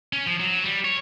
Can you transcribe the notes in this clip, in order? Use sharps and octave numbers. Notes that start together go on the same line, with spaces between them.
C#4
F3
F#3
G3
C#5